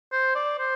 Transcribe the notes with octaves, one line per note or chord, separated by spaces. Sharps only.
C5
D5
C5